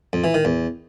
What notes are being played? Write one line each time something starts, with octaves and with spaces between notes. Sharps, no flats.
F2
E3
D#3
E2